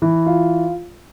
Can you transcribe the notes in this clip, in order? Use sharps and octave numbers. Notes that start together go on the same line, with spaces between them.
E3
F4